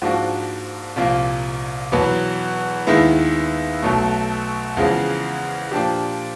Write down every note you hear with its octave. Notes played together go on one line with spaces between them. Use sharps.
G#2 F3 A#3 D4 F#4
C2 A#2 F3 A#3
E2 B2 F#3 B3
D#2 D#3 G#3 B3 E4
B1 B2 F#3 A3
E2 C#3 F3 G#3 C4
A#2 F3 A#3 D4 G4